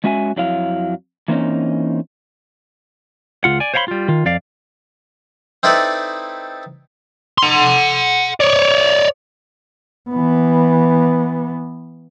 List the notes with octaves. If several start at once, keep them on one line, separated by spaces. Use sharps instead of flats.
G#3 C#4 F#4 E5 G#5
F2 F#3 E4 F5
E3 A#3 C4 C#4 D#4
C#2 F4 F#5
D5 G#5
C5 C#5 F5 F#5 B5 C6
G3 F4
D#3 F4
F2 D5 F5
C4 D#4 E4 A4 B4 D5
F#5 C6
C#5 D5
E3 B3